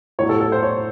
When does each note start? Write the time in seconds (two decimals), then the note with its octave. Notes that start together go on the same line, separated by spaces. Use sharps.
0.19 A2 C#5
0.22 F#3
0.29 A4
0.41 A4
0.52 C5
0.63 C#5